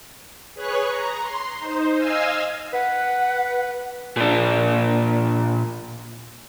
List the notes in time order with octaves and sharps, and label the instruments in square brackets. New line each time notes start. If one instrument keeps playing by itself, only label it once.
[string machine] G#4 B4 C#5 C#6 F#6
A#5
C6
D#4 C5
D#5 F5 G#5 E6
[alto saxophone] B4 [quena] F#5
[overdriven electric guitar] A#2 D4